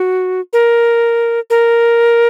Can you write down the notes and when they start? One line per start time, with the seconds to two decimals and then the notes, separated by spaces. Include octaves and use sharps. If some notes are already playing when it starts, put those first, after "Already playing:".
Already playing: F#4
0.53 A#4
1.50 A#4